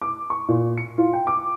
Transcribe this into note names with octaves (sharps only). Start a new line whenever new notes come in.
D6
C#6
A#2
C#7
F4
G5
D6